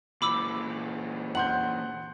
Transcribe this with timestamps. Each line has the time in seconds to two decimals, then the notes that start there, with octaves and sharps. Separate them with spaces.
0.22 A#2 E3 B5 D6 E6
1.35 F#5 C6 G6 F#7